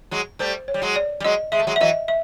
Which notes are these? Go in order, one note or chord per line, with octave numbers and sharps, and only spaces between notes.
F#3 G#3
G3 A3 C5
C#5
G3
F#3 G#3
D5
G3
F#3 G#3 D#5
G#3 E5
A3
F#3 G#3
E5
E3 F#3 D#5
E5